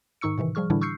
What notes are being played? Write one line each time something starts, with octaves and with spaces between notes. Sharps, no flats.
G#2 D#3 D#4 C#6 E6 C#7
A2 C3 D#3 E3
F3 G3 G#4 C#6 F6
A2 D3 E3 G3 D4 E4
C#6 E6 F6 G6 C7 C#7